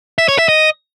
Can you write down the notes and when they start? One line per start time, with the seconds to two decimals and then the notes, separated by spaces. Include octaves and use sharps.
0.18 E5
0.28 C#5
0.39 E5
0.49 D#5